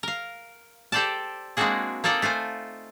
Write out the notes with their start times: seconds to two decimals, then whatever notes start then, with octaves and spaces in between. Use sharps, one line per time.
0.03 A#4 F5
0.92 G4 A4 C5 D5 G5 A5
1.57 G#3 A#3 C4 D4 F#4 G#4
2.04 A#3 D#4 A4 D5 D#5 G5
2.22 A3 F4 C5 G#5